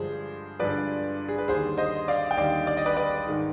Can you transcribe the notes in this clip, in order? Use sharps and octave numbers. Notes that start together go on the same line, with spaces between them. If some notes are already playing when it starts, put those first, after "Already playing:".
Already playing: G2 D3 F3 G#3 G#4 C5
G2 D3 F3 G#3 B4 D5
G#4
B4
D#2 D3 G3 G#4 C5
C5 D#5
D5 F5
G5
D#2 D3 G3 D5 F5
D5
D#5
B4 D5
B4 D5
G#2 D#3 G#3